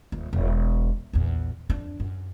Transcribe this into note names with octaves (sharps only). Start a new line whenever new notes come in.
D#1
E1
A#1 E2
F2 D4
F#2